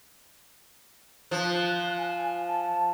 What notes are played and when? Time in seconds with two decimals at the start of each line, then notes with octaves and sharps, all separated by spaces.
1.31 F3 F#6
1.98 G#5
2.48 A5